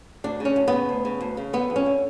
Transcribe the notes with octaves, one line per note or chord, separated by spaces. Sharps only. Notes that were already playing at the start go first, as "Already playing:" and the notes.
D2 D4
C#3
C#4
D2
C#3 B3
D2
C#3
D2
C#3
D3 B3
F2
C#4
D3